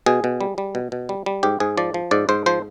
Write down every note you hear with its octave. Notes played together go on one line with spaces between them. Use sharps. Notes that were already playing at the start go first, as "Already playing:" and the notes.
B2 G#4
B2
G3
G3
B2
B2
G3
G3
G#2 G4
G#2 G#4
F3 D5
F3
G#2 D5
G#2 C5
F3 C5